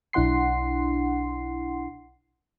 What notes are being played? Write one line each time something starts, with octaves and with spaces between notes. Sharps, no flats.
B1 D4 E4 F#5 C6 C7